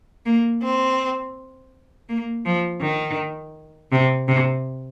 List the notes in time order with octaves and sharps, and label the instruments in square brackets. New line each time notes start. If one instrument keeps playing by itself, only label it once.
[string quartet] A#3
C4
A#3
F3
D#3
C3
C3